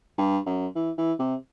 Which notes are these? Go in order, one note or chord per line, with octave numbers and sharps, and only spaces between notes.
G2
F#2
E3
E3
C3